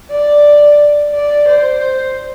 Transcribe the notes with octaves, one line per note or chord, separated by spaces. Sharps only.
D5
D5
C5